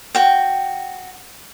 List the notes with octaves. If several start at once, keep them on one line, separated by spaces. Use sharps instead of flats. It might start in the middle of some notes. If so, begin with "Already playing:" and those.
F#4 G5